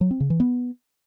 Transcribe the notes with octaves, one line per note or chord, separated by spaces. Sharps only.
F#3
C4
C#3
E3
B3